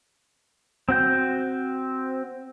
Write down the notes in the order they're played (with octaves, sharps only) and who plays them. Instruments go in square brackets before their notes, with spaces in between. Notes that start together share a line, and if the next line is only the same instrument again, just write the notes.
[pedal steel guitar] C4 F#4 G6